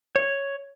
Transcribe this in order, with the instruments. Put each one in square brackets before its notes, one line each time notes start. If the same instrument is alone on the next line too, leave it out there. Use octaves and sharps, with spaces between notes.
[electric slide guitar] C#5